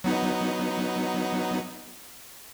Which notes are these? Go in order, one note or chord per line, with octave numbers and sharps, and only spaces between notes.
F#3 B3 D#4